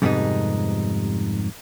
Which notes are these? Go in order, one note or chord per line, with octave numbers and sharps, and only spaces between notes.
F2 G#2 C3 G3 B3 D#4